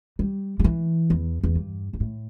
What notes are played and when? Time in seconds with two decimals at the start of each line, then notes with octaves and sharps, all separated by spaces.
0.19 G3
0.59 G3
0.64 E3
1.10 E2
1.44 E2
1.55 G2
1.93 G2
2.00 A2